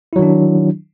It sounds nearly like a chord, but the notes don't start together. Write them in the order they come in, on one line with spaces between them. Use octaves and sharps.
E4 F#3 D#3 D4